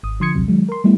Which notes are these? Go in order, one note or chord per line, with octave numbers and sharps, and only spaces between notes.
G#1 D#6
D3 F3 C6 D#6 G#6 C#7
A#1 D#2 C3 F#3
D#3 F#3 G#3
A#4 C6
G3 A3 B3 E4